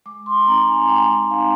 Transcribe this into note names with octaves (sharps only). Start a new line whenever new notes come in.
G#3 D6
C6
C4 D#4 A#5
G#5
G#3 G5
C4 D#4 F5